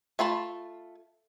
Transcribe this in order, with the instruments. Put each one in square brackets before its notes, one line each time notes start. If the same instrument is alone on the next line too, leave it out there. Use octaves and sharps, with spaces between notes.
[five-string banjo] A3 F4 A5 B5